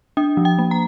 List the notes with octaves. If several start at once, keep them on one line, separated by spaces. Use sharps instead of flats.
D4 G5
F3
G5
A#3
A#5